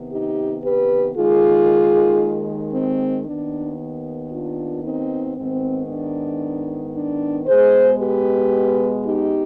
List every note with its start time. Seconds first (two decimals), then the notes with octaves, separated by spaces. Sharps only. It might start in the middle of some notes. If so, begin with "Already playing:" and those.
Already playing: C3 D#3 B3
0.11 D#4 G4
0.63 G4 B4
1.15 D#2 D#3 G#3 F4 G#4
2.73 C4
3.26 D#2 D#3 B3 D4
4.31 D4 F4
4.83 C4 D#4
5.36 G#2 D#3 B3 C4
5.89 D4
6.94 D4
7.46 B2 G#3 B3 G#4 C5
7.99 G4 B4
9.04 D#4 G4